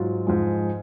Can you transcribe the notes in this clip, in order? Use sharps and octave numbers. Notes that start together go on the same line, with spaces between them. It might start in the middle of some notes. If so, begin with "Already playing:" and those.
Already playing: G#2 F#3 F4
G#2 F3 G#3